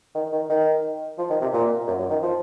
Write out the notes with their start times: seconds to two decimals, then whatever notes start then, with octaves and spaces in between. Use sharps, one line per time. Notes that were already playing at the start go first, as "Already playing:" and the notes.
0.15 D#3
0.32 D#3
0.49 D#3
1.18 F3
1.30 D#3
1.41 C3
1.53 A#2
1.87 F#2
2.00 F#2
2.10 D#3
2.22 F3